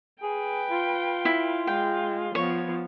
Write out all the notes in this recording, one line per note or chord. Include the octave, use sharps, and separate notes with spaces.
G#4 B4 G5
F4
E4
G#3 G5
F3 B3 C#5